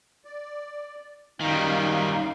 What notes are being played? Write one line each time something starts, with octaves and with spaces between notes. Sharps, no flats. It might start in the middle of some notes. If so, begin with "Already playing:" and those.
D5
F#2 D#3 G3 D#4 F5